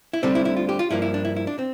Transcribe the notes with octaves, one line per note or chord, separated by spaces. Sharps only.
E4
D2 D3 G3 C4 D4
E4
E4
F4
G4
F4
G2 F3 A#3 E4
E4
D4
E4
E4
D4
C4